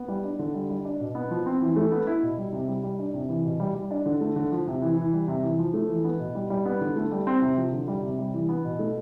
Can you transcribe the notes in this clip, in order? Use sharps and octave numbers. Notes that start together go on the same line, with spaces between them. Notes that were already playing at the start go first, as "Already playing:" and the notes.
Already playing: B3
G3
D4
D3
G3
G3
D4
B2
B3
F3
C4
E3
A3
B3
E4
B2
G3
C3
G3
G3
D4
C3
E3
B2
G3
G3
D4
D3
A3
D3
F3
C3
E3
E3
G3
C3
E3
F3
A3
E3
B3
B2
G3
G3
B3
D3
A3
G3
C4
C3
F3
D3
G3
C3
G3
E3
B3
B2
A3